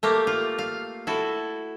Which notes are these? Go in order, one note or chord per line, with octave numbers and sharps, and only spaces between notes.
A3 A#3 G4
F4
F5
E4 F#4 A4